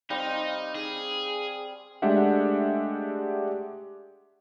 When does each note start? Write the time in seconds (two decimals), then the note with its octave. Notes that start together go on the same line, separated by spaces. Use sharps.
0.10 G3 C4 D#4 F5
0.75 G#4
2.02 G#3 A3 D4 G4 E5 F#5